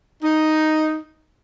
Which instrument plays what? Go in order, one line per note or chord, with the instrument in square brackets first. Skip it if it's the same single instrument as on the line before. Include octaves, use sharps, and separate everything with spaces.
[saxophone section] D#4